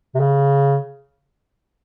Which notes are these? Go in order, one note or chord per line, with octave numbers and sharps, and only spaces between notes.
C3
C#3